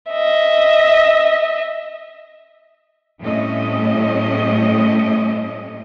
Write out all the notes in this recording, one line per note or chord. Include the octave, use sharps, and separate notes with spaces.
D#5 E5
A2 G3 A3 C4 C#4 D#5